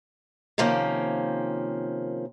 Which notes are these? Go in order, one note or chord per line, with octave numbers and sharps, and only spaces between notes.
C3 D#3 F3 A#3 C#4